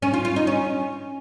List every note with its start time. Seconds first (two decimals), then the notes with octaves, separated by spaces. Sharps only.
0.02 C#4
0.13 F4
0.25 F4
0.36 D#4
0.47 C#4